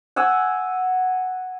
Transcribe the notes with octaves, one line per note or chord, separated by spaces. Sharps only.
F#5 G#5 E6